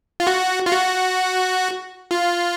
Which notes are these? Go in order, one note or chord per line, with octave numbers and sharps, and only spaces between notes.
F4
F#4
F4
F#4
F4